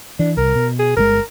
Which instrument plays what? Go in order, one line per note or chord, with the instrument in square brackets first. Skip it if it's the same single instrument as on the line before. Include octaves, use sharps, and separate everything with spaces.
[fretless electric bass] E3 [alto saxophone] D4
[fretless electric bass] C2 [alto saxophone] A#4
[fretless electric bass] B2
[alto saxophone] G#4
[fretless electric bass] G1 C3 G#3 [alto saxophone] A#4